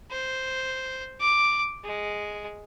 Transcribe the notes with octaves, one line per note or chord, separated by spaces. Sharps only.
C5
D6
G#3